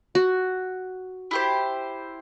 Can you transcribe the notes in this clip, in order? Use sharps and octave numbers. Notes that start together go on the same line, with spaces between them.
F#4
E4 G4 C5